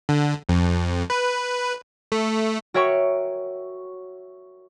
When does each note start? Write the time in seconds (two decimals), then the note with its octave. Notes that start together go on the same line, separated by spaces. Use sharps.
0.09 D3
0.49 F2
1.10 B4
2.12 A3
2.74 F#4 A#4 C#5 E5 G5 C#6